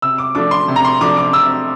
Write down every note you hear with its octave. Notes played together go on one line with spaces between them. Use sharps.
C3 E6
D6
F3 A3 D4 D6
C6
C3
A#5
C6
F3 A3 D4 D6
D6
C3 E6